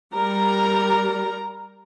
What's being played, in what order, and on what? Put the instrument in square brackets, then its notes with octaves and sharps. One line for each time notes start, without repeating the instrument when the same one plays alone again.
[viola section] G3 A#4 A#5